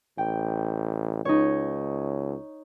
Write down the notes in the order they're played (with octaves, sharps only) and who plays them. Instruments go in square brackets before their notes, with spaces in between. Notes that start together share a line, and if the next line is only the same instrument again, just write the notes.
[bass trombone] A1 [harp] G5
[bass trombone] C#2 [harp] D#4 C#5